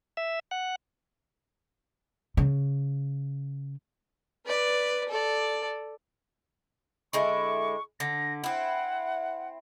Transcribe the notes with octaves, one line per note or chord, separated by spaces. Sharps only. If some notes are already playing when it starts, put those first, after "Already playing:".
E5
F#5
C#3
B4 D5
A4 D5
D3 G#3 E4 C#6
D3 A#6
C4 E4 F#5